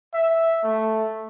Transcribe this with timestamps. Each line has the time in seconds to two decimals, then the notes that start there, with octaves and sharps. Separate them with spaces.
0.14 E5
0.64 A3